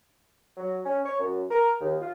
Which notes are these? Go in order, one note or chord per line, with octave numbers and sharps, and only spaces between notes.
F#3
C#4
C#5
F#2
A#4
D#2
F4